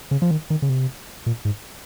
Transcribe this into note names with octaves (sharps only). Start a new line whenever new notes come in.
C#3
F3
D#3
D#3
C#3
C3
A#2
G#2